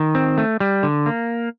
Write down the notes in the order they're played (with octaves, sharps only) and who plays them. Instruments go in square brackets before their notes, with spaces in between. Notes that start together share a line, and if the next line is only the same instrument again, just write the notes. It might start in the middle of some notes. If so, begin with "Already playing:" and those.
Already playing: [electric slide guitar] D#3
C4
A3
G3
D3
A#3